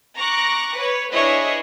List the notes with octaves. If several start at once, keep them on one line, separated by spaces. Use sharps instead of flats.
A#5 C#6 D6 F#6 A#6
B4 C#5
D4 E4 G#4 B4 C#5 D#5